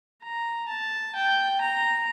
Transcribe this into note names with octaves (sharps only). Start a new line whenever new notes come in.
A#5
A5
G5
A#5